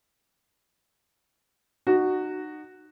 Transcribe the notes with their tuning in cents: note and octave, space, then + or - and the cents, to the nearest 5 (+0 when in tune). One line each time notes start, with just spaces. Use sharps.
D#4 -35 F#4 +0